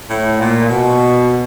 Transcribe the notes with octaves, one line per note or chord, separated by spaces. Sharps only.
A2
A#2
B2